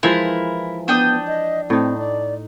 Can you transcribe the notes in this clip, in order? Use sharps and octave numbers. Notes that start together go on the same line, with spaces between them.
E3 F3 G#3 E4 A#4
B3 D4 G5 D#6
D#5
A2 C4 D#4
D5